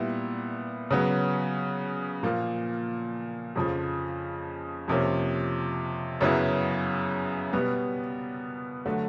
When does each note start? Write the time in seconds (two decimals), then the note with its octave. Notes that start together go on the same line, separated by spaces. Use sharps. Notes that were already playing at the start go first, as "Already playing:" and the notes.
Already playing: A#2 G3 B3 E4
0.91 C#3 F#3 B3
2.23 A#2 F3 A#3
3.56 F2 C#3 F3
4.88 F2 C3 F3 A#3 C#4
6.21 F#2 C#3 F#3 B3 E4
7.53 B2 G3 B3
8.86 D3 F#3 A3